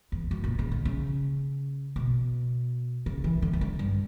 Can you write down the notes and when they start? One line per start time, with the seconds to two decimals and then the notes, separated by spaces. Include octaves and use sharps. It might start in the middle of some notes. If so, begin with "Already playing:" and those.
0.12 E2
0.31 F#2
0.44 A#2
0.59 C#3
0.71 D3
0.85 C#3
1.96 B2
3.06 C#3
3.24 E3
3.42 D3
3.53 E3
3.61 D3
3.79 G2